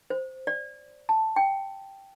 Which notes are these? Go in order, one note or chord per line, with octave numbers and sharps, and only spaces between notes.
C5
D5
A5
G5